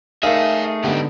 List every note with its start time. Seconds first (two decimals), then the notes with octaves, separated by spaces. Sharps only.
0.23 A3 D#4 G#4 A#4 C#5 E5 F5
0.84 G#2 D3 B3 D#4 G4